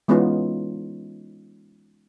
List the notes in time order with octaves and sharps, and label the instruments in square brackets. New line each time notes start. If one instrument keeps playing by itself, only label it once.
[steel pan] E3 G#3 B3 C#4 D#4 F4